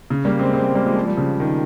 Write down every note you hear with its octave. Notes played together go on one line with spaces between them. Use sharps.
C#3
G3 A#3
G#3 C4
G#3 C4
G#3 C4
G3 A#3
F3 G#3
F3
G3
C#3 F3
D#3